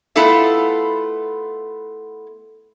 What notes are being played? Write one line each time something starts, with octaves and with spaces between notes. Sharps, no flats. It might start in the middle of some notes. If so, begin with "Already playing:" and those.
A3 B3 E4 F4 A4 E5